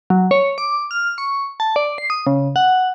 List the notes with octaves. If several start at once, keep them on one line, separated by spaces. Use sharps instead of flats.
F#3
C#5
D6
F6
C#6
A5
D5
C7
D#6
C#3
F#5